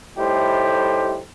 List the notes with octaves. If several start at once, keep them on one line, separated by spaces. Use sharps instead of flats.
A2 G3 A3 D#4 G4 C5